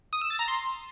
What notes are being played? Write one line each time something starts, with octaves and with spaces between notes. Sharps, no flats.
D#6
E6
A6
A#5
C6